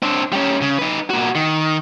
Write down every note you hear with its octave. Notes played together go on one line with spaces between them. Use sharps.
C4 D4
G3 C#4
C#3
D#4 B4
A#2 F#4
D#3